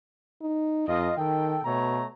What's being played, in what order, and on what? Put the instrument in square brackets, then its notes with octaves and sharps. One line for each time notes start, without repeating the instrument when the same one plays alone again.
[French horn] D#4
[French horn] F2 [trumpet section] F4 D#5
[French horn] D#3 [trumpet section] A4 G5
[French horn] B2 [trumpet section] A3 C#5 A#5